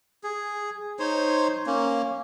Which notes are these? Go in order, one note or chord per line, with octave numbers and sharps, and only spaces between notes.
G#4
D#4 C5 C#5
A#3 C#4